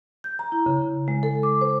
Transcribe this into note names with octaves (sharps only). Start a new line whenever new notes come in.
G6
A#5
E4
C#3
G#3
A4
D6
C5